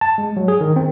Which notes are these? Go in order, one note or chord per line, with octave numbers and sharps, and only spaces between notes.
A5
G#3
F#3
G#4
D#3
C4